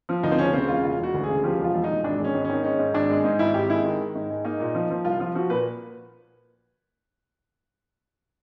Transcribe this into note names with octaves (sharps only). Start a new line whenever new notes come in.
F3
D2 D#4
C4
C#3 C#4
C#3 C4
E1 F4
E1 F4
E1 F#4
D2
G#4
C#3
F3 G4
E1
F4
E1
D#4
E1
G#1 D4
G#3
C#4
G#1
D#3 C#4
G#3 C#4
G#2
G#1 D4
G#3
G#2 D#4
G#1 E4
G#1 G4
G#3 E4
D#3
D#3
G#2
G#3
A#3 D#4
A#2
F3
F3
C2 F4
F3 F4
F3 F#4
A#2 B4